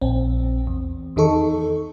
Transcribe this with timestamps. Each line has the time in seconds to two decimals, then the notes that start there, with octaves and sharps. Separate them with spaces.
0.02 A#1 C4
0.67 E2
1.16 E2 D#3 D#4 A4 C#6